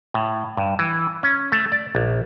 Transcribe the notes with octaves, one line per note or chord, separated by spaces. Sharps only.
A2
G2
E3
C#4
A3
D5
A#1